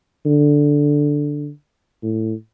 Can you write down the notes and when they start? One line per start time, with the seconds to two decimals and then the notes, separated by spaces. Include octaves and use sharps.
0.26 D3
2.03 A2